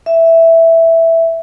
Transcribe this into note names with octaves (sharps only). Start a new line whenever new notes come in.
E5